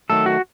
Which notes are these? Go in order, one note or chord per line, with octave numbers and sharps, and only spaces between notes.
D#3 F#3 A3 A4
F#4